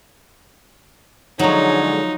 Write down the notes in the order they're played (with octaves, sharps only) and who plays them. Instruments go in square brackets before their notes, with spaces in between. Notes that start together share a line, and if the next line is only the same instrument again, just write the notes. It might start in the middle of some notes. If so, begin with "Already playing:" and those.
[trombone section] D3 G#3 [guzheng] F3 F#3 [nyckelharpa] D#4 [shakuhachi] C#5